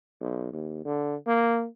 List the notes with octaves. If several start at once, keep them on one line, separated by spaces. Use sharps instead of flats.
B1
D#2
D3
A#3